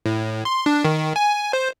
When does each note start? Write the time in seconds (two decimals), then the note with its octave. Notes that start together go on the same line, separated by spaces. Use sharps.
0.06 A2
0.45 C6
0.66 D4
0.85 D#3
1.16 G#5
1.53 C5